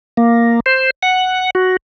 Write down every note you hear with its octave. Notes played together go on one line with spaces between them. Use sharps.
A#3
C5
F#5
F#4